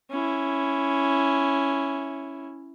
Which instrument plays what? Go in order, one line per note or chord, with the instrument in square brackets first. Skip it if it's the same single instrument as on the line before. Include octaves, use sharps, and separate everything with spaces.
[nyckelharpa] C#4 E4